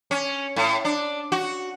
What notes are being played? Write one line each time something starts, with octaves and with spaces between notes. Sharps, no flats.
C#4
A2
D4
F#4